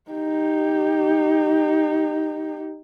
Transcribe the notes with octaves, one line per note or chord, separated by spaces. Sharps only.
D#4 G4